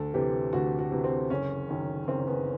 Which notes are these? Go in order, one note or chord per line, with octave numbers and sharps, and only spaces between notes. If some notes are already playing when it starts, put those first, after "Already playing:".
Already playing: D2 A4
C3 E3 G4
D2 F#4
F#4
C3 E3
C4
F#1 C#4
F#2 D#3
F#1 C4
B3